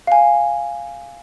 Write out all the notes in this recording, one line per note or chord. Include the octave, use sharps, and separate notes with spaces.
F5 G#5